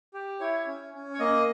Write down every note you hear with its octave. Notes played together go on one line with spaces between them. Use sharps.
G4
E4 C#5
C#4
C#4
C#5
A#3 D#5